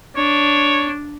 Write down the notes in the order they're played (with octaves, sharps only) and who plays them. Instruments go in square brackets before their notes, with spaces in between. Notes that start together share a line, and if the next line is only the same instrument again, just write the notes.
[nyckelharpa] D4 [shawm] C#5